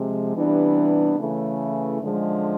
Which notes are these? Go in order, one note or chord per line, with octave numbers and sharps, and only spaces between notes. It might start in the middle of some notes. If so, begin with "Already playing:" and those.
Already playing: C3 F3 G#3
C3 E3 G3 B3 D4
C#3 E3 A3
F#2 D3 F3 G#3